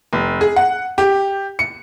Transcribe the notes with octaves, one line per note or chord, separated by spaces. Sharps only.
F1
G#4
F#5
G4
C#7